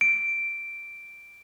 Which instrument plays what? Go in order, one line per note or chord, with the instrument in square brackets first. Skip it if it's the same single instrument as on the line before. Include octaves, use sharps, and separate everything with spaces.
[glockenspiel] D7